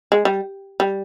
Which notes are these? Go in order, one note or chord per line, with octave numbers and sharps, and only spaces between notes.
G#3
G3
G3